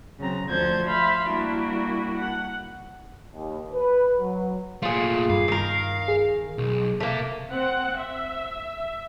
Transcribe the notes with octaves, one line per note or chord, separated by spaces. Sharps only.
C#3 F#3 C4 A#5
D2 F3 A4 C5 G6 G#6
E5 F5 B5 C6
G3 A#3 D4 E4 F#4
F#5
D#2
B4
F#3
A#2 A3 F4 G#4
G2 F5
D#3 A#4
G#4
B1
C3 A3 A#3 E5
C4 F#5
E5